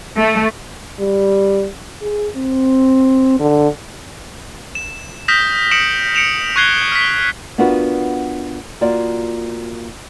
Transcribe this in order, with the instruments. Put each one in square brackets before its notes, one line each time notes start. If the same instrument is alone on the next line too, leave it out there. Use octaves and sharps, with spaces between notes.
[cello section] A3
[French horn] G3
G#4
C4
D3
[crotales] E7
D#6 F6 G6 A#6 B6 E7
D#6 C#7 D7 E7 F#7
C#7 D7 E7 F7
C#6 F#6 G#6 C7 G7
F6 B6
[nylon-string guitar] B3 D4 F4 F#4 A#4 B4
A#3 F4 F#4 D5